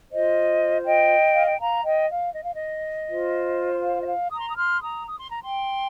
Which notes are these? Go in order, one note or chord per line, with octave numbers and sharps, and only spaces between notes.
F4 C5 D#5
D#5 G5
F5
G5
F5 A#5
D#5 G5
F5
D#5
F5
D#5
F4 C5
F5
D#5
F5
A#5 D#6
C6
D#6
C6 F6
A#5 D#6
D#6
C6
A#5
G5 C6